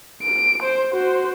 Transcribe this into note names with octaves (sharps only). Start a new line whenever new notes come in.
D7
C5
F#4 C5